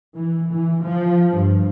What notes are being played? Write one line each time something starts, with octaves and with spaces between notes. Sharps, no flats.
E3
E3
F3
G2